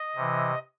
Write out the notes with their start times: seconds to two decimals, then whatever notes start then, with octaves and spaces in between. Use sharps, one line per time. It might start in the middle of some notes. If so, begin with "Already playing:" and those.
Already playing: D#5
0.16 C3 E3